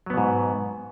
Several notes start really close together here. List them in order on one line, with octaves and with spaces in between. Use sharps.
F#3 B3 B2 G#2